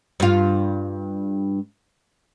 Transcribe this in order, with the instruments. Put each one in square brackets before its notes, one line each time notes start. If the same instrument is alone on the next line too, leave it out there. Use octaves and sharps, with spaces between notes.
[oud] G2 F4